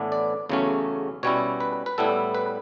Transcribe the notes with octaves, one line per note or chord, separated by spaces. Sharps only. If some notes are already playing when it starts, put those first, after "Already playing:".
Already playing: A2 E3 B3 D4
D5
E2 C#3 F#3 A3 C#4
B2 G3 C#4 E4 C#5
B4
B4
A2 G3 B3 E4 A4
B4